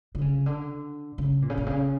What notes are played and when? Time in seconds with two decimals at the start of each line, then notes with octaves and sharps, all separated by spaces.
0.15 D3
0.21 C#3
0.46 D3
1.18 C#3
1.42 A#2
1.50 C#3
1.58 A#2
1.66 C#3